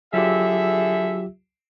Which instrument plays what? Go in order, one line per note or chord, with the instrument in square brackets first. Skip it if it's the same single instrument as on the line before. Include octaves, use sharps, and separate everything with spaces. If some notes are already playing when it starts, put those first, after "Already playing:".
[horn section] D3 G#4 E5 [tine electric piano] F#3 F4 G4